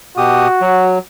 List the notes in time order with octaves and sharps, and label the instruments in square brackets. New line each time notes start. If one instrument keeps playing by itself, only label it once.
[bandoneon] B2 G4 D#6 [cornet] F#4
[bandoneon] F#3